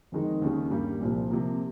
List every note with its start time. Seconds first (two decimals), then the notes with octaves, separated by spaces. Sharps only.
0.12 F2 D#3 G#3 D#4
0.42 D#2 C#3 G3
0.71 G2 G3 A#3
1.01 C2 A#2 F3
1.31 C3 F3 A#3